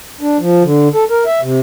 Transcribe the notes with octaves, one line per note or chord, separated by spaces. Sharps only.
D4
F3
D3
A4
A#4
E5
C3